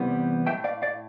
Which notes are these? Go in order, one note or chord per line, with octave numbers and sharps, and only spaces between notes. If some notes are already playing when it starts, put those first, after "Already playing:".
Already playing: E2 C3 E3 G3 B3
A2 F3 A3 E5 G5
D5 F5
D5 F5